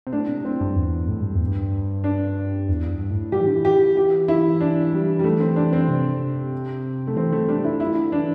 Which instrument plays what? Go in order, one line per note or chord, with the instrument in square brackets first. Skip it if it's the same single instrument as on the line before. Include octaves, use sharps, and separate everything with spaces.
[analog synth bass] C3
[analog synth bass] A2 [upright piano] D4
[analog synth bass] C3
[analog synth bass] A2 [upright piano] C4
[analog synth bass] G2
E2
A2
G2
E2
G2
[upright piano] D4
[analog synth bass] E2
G2
A2
[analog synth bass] G3 [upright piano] G4
[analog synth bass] E3
D3
E3
[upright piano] G4
G4
E4
D4
G3
G3
A3
C4
D4
C4
[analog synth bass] C3
[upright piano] A3
[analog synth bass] E3 [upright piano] C4
[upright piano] A3
[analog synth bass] G3 [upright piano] D4
[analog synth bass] E3 [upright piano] E4
[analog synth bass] G3 [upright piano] E4
[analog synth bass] E3
D3
[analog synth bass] E3 [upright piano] D4